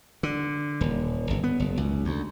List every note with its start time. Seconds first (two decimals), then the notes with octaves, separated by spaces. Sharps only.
0.23 D3
0.81 D#1
1.30 G1
1.44 B3
1.60 F#1
1.77 C#2
2.05 D2